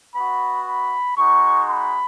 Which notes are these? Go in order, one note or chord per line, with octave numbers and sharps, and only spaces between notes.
B3 F#4 B5
B5
G#3 D#4 F#4 C#6
B5